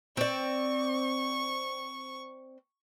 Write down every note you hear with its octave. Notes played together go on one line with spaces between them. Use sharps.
C4 D5 C#6